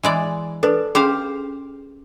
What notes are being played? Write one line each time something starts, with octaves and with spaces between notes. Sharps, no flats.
E3 G#3 D5
D4 A4 B4
C#4 G4 G#4 C5 F5